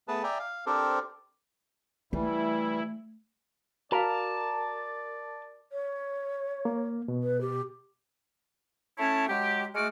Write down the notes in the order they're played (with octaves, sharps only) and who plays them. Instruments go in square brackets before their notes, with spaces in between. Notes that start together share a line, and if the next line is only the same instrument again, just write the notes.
[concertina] A3 B3 G#4 B4 A5
D5 E5 G5 G#5 A#5
F5
C4 D4 G4 A4 A#4 C5
[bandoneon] E3 G3 [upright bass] A3 [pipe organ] E4
[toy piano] F#4 F5 [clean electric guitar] A#4 [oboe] D5 [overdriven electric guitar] A5
[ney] C#5
[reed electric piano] A#3
B2
[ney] B4
G4
[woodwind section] A3 C#4 E4 C#5 A5
F#3 G#3 G4
G#3 A3 F#4 D6 F6